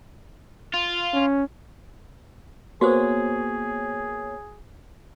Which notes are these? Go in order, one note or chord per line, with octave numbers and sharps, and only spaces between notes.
F4
C#4
A#3 B3 F#4 G#4 C5 C#5